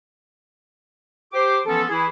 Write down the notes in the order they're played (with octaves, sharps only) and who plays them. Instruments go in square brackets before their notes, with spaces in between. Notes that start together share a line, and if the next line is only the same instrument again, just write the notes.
[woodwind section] G4 C5 D6
E3 F3 B3 C#4 A4
E3 E4 G#4